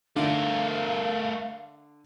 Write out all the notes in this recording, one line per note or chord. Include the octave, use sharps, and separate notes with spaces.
D3 A3 A#4 F5